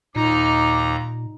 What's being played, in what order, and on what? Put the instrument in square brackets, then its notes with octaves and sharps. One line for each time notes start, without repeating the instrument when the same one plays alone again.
[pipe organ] D#2 A#5 [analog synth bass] A#2 [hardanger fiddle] D#4 [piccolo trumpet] D6